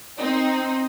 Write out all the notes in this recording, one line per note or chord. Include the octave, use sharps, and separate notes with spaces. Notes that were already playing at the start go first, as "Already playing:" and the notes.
C4 D#4